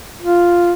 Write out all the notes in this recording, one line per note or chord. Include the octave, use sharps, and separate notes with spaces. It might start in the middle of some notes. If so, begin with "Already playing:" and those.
F4